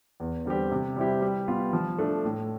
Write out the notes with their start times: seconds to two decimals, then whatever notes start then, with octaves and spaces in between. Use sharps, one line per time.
0.20 E2
0.45 D3 G3 C4 G4
0.72 C3
0.96 G3 C4 E4 G4
1.22 G3
1.48 B3 F4
1.73 F3
1.98 A3 D4
2.25 A2